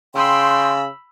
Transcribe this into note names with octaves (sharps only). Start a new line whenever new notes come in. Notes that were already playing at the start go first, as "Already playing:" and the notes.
C#3 G5 B5 C6 E6